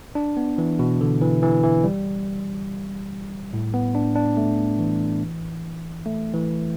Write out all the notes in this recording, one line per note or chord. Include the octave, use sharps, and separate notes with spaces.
D4
B3
E3
B2
D3
E3
E3
E3
G3
A2
B3
D4
D4
A3
E3
A3
E3